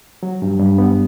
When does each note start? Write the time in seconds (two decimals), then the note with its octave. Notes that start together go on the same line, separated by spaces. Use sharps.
0.23 F#3
0.42 G2
0.60 G2
0.78 B3